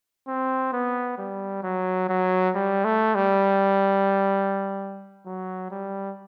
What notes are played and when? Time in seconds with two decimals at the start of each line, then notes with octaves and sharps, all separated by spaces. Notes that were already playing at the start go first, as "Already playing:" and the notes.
0.28 C4
0.73 B3
1.18 G3
1.63 F#3
2.09 F#3
2.55 G3
2.84 A3
3.15 G3
5.26 F#3
5.71 G3